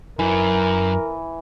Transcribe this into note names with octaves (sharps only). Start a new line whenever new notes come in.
F#2 E3 A#4